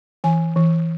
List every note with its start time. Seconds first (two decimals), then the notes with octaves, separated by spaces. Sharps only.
0.24 E3 G#5
0.56 E3